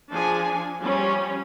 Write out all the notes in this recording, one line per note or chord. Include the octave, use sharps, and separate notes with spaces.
F3 D4 G#4 G#5
F3 G3 C#4